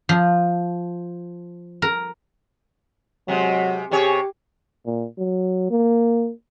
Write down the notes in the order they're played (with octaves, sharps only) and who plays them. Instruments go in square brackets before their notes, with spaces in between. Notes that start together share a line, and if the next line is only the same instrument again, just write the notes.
[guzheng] F3
A#4
[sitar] C3 G#3 [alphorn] F#3
[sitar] C3 G#4 C#5 [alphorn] G4
[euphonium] A#2
F#3
A#3